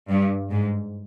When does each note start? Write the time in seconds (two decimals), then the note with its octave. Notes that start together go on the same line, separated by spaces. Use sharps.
0.10 G2
0.51 G#2